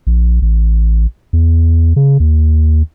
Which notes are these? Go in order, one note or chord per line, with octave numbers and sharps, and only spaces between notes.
A#1
A1
E2
C#3
D#2